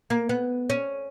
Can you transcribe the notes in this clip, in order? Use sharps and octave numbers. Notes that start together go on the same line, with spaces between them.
A#3
B3
C#4